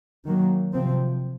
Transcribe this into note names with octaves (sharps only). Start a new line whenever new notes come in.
D#3 F#3 A#3
C3 F3 C4